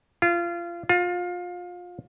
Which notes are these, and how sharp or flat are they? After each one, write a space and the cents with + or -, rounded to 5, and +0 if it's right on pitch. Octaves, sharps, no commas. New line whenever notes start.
F4 -25
F4 +25